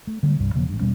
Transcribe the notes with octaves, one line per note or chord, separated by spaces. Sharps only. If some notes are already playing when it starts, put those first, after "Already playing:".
A3
D3 G3 G#3 A#3
C2 G2
E1 C#3 F3 A#3
A1 G2
E1 B2 G3 C#4